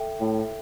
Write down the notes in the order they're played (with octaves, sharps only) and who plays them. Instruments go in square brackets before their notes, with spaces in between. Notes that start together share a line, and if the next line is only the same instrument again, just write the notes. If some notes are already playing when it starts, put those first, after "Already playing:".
Already playing: [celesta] A4 E5 G5
[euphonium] A2 [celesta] A4 E5 G5